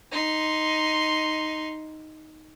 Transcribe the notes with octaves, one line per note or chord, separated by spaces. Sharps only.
D#4 C6